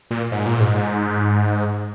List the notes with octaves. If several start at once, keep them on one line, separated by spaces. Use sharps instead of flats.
A#2
G#2
A#2
G#2